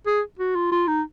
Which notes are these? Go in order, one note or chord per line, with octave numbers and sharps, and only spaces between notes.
G#4
F#4
F4
F4
D#4